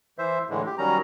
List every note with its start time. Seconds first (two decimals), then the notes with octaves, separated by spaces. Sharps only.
0.18 E3 C5 E5
0.50 A2 D3 E3 G#3
0.66 G4
0.78 D#3 F#3 G3 C#4 A#5